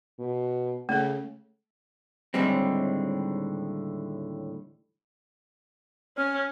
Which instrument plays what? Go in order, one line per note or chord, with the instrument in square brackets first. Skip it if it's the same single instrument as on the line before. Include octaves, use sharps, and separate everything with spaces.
[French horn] B2
[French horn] C#3 [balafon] A3 A4
[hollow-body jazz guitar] D#2 A2 D3 G3 G#3 C4
[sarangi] C#4 [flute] F6